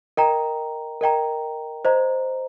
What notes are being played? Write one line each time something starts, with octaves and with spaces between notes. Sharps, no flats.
A#4 D#5 G5 A#5
A#4 D#5 G5 A#5
C5 D#5 A#5